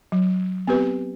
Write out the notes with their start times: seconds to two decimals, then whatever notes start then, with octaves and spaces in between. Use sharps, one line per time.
0.12 F#3
0.67 B3 C4 G4 B4